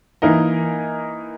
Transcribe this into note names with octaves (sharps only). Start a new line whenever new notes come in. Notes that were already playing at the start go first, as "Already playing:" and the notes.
E3 A#3 D#4 A#4 D#5